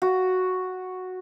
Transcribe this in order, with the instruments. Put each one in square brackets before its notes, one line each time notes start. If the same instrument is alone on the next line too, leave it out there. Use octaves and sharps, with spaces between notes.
[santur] F#4